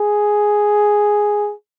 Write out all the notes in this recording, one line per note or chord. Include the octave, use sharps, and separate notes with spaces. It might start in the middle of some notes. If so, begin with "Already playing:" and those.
Already playing: G#4